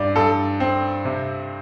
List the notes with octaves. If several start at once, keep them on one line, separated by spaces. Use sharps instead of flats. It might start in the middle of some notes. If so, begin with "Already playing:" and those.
Already playing: G2 D5
G2 A4
C4
C3